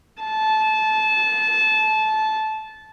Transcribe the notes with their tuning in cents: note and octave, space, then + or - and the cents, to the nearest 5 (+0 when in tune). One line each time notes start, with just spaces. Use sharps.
A5 -20